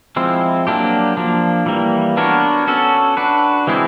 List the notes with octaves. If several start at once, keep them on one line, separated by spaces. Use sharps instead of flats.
F3 G#3 C4 E4
F#3 A#3 D4 G4
F3 A#3 D4
E3 G3 A#3
B3 D4 F#4 A#4 C#5
C#4 F#4 A4
D4 F#4 B4
E3 G#3 C4 E4 G#4